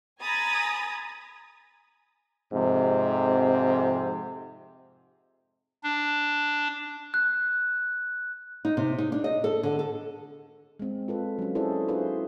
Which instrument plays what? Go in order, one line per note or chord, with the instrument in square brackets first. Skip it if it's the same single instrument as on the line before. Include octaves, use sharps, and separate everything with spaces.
[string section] G#5 A#5 B5 D#6 G#6 A6
[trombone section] F2 G#2 C3
[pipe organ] D4
[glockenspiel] F#6
[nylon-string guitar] D#4
C3
D#4
D4
D#5
A4
D3
A4
[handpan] G#3 C4
F4 A4 B4
F#3 C#4
E4 F#4 G#4 A4 C5 D5
D4 E4 F4 G#4 B4 C5